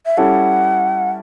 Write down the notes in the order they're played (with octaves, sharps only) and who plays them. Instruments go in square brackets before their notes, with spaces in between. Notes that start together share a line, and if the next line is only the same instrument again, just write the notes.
[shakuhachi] E5
[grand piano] G3 C#4 E4 A4 [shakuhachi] F#5